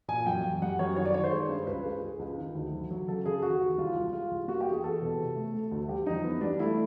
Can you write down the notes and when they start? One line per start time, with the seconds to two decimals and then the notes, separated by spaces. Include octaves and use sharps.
0.08 A#2 G#5
0.26 F#2 G5
0.44 F#2
0.62 G3 F#5
0.79 F#2 C#5
0.96 D#3 C#5
1.05 D5
1.14 D#3 C#5
1.24 C5
1.31 G#3
1.49 G2
1.67 C#2 B4
1.84 G#3
2.02 G#3
2.19 C#2
2.38 D#3
2.55 D2
2.72 F#3
2.91 F#3
3.08 C#3 A4
3.26 C#3 G#4
3.42 D#2 F#4
3.60 D#2
3.78 C2 F4
3.95 C2
4.13 G#3 F4
4.31 C2
4.48 A#3 F#4
4.60 G4
4.66 E2
4.72 G#4
4.84 E2 A4
5.02 B2
5.18 C3
5.36 A3
5.54 A3
5.71 D2
5.89 G3 G4
6.06 F2 D#4
6.24 E3 B3
6.41 G3 D4
6.60 A3 E4